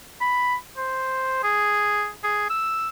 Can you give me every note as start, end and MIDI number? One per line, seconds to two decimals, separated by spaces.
0.21 0.55 83
0.77 1.43 72
1.43 2.09 68
2.24 2.48 68
2.50 2.89 88